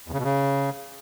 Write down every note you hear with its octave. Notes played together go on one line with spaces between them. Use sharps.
E2
C#3
B2
C#3